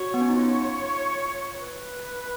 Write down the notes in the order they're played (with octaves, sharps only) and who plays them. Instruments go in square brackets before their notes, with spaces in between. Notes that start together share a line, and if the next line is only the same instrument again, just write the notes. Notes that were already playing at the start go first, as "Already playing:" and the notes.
Already playing: [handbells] F#4 [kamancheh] C#5
[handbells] B3
C#4
D#4
[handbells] F4 [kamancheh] C#5
[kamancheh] B4